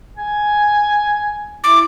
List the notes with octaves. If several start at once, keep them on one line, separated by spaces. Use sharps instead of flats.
G#5
E4 D6